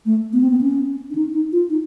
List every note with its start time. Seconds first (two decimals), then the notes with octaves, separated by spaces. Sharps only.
0.06 A3
0.33 B3
0.41 C4
0.51 B3
0.61 C#4
1.10 D4
1.15 D#4
1.33 D#4
1.52 F4
1.70 D#4